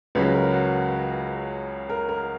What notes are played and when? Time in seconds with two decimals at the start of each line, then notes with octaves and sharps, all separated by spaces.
0.15 C#2 C#3 F#3 B4
0.34 A#4
0.53 F#4
1.90 A#4
2.09 A#4